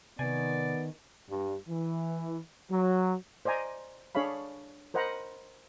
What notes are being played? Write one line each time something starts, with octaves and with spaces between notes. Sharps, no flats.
C3 D#3 B3 D5 G#5
G2
E3
F#3
C5 D5 D#5 G#5 A#5
D4 G#4 C#5 F5 B5
A#4 C5 D#5 F#5 A#5 B5